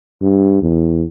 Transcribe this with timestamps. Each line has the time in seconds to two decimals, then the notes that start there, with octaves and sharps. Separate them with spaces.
0.22 G2
0.62 E2